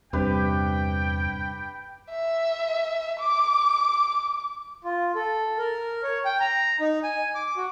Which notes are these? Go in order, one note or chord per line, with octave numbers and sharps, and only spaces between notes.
E2 G2 C3 G4 B4 G5
E5
D6
F4
A4
A#4
C#5
G5
A#5
D#4
G#5
D6
F#4